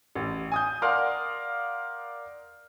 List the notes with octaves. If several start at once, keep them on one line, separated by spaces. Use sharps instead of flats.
A1
G#5 D#6 G6
A#4 D5 F5 F#5 C6 F6